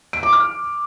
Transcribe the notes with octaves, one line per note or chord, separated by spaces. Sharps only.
D7
D6
F6